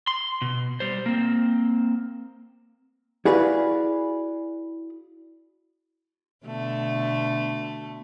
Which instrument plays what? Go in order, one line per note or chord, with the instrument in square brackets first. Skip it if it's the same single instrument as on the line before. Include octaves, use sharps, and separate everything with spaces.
[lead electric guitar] C6
B2
G3 C5
A#3 C4
[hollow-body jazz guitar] E4 F#4 G#4 B4 D5 F5
[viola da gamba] B2 D3 A3